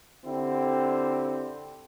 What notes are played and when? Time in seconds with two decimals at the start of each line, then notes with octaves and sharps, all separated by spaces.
0.25 D3 C4 E4 G4